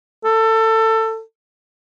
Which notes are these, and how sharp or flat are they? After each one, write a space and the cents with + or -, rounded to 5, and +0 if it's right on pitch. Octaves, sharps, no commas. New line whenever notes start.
A4 +20